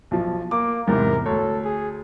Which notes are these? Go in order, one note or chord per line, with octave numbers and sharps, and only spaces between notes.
B1 F3
A#3 D6
E2 G#2 C3 A#4
D2 A4 C#5
G#4